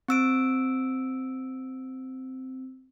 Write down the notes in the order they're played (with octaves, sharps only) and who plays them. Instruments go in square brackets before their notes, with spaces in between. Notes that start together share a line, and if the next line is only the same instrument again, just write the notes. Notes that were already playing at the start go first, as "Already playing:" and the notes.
[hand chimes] C4 E6 D7